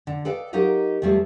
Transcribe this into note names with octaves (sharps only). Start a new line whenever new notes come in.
D3
A4 B4 D5 D#5 F5 G5
F#3 D#4 G4 A#4 D#5 F5
E2 F3 G3 A3